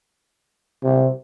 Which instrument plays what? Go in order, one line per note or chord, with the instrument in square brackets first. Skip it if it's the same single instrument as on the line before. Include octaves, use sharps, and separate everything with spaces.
[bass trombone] C3